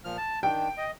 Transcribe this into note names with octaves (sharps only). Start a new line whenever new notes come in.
A#2 F3 F6
A5
D#3 D4 G5
D#5